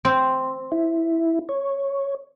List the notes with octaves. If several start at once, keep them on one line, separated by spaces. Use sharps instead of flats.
C4
E4
C#5